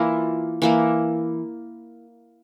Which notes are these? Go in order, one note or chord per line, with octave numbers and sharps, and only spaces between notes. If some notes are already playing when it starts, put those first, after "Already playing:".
Already playing: E3 A#3 E4 F4
E3 A#3 E4